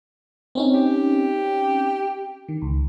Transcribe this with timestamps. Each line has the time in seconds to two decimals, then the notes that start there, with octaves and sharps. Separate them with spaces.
0.55 C4 C#4 D#4
0.74 G4
2.48 D#3
2.62 C#2